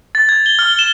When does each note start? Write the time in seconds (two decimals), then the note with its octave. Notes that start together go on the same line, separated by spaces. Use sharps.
0.15 A6
0.29 G#6
0.46 G7
0.59 F6
0.79 E7